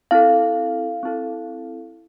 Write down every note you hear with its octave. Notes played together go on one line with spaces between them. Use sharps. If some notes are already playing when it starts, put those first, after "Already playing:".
C4 E4 A4 F5
C4 E4 A4